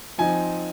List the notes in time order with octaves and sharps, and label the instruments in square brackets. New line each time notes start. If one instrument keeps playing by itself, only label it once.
[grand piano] F3 C4 D#4 G#5